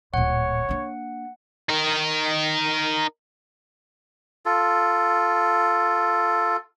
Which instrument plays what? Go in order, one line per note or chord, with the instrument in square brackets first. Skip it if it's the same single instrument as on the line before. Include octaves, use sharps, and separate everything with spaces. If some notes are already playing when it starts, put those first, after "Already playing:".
[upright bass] D1 A#2 [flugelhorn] C#5 [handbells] F#5
[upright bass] A#3 D4
[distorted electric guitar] D#4 A#4
[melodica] F4 A4